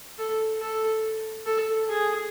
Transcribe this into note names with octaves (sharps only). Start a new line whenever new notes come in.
A4
A4
A4
G#4